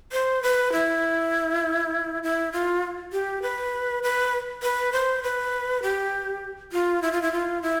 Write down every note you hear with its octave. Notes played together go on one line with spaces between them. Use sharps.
C5
B4
E4
E4
F4
G4
B4
B4
B4
C5
B4
G4
F4
E4
F4
E4
F4
E4